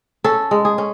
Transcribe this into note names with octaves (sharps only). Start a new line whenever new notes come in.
C#4 A4
G#3
G#4
C#4